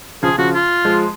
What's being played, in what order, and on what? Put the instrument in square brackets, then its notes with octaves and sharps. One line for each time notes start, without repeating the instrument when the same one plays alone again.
[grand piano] C#3 F3 [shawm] G#4
[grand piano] C#3 F3 [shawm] F#4
[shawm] F4
[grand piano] F3 G#3